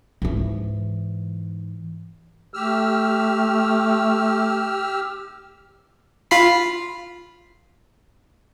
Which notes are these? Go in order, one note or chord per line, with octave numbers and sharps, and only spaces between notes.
G#2 E3
A3 G4 E6 F6
F4 B5 C7